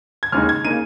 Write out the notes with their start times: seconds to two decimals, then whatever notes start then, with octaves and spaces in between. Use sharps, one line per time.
0.23 G#6
0.32 D#2 C#3 G#3 D#4 F6
0.49 G#6
0.65 C#3 A#3 D#4 D#7